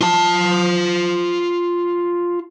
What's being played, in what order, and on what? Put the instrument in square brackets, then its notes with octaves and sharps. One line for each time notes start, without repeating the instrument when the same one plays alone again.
[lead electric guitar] F4 A5